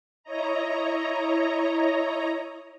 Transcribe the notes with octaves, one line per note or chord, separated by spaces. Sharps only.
E4 C#5 D#5 A#5